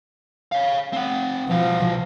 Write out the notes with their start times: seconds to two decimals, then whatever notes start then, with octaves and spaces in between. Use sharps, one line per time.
0.52 C#5 F5
0.93 C4 F#5
1.50 B2 F3 F5